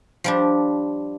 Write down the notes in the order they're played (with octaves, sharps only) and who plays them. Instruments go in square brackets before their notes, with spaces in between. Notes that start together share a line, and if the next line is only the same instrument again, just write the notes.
[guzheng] F3 G3 D4